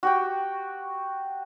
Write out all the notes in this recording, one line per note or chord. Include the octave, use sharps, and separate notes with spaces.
F#4 G4 G5